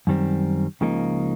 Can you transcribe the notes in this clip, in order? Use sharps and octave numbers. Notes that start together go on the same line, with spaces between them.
F#2 D#3 G3 C4
C#2 C#3 F3 A#3 D#4